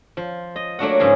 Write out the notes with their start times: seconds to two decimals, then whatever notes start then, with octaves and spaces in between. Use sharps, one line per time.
0.17 F3
0.56 D#5
0.79 F#3 A3 A#3 D4 F#4 F#5
0.99 G#2 C#3 F3 G#4